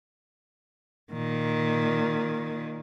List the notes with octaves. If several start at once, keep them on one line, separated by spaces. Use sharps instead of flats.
A#2 D#3